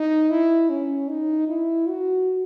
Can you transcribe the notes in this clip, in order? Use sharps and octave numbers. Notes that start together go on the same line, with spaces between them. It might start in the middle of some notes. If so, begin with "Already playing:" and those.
Already playing: D#4
E4
C#4
D#4
E4
F#4